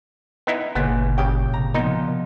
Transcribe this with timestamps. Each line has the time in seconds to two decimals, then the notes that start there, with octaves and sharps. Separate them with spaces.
0.47 B3 D#4 E4
0.75 G1 A#2 C#3 B3
1.18 C#3 G4 G5
1.53 C3 A#5
1.74 A#2 F3 B3 D#4